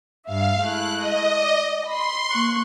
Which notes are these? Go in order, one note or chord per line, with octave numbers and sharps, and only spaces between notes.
G2 E5 F5
G#3 A3 E4 F#6
D#5
D5
B5 C6
A#3 C#6 F#6